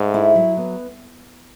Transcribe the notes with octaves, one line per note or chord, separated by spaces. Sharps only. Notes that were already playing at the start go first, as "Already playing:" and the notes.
Already playing: G#2 A3
E4
F#3
B3